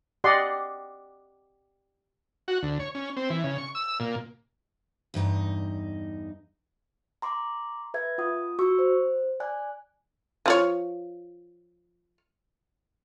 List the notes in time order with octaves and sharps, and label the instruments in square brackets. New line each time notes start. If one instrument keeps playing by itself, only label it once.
[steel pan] G4 D5 D#5 F#5 C6
[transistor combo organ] F#4
D2
C#5
C#4
C4
E3
C#3
C#6
E6
A#2
[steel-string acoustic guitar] E2 G2 D#4
[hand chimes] A#5 C6 D6
B4 E5 G#6
F4 F#5 D#6
F#4 C#6 E6
C5
D5 G#5 F#6
[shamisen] F3 F4 C#5